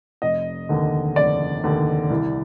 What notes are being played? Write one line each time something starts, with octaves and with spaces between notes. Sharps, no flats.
F1 D#5
D#2 D3
F1 D5
D#2 D3
C2